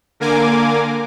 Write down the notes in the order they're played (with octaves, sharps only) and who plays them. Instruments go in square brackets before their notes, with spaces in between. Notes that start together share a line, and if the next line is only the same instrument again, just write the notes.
[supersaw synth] D3 A#3 A#4 G#5 D6